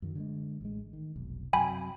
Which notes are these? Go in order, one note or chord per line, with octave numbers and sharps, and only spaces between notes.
F#2 D#3 F#3
D3 F#3 G#3
A1 G#3
D#3
F1 B1
F#2 C3 F#3 G5 G#5 B5